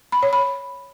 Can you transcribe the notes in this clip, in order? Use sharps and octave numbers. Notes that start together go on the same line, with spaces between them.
B5
C#5
B5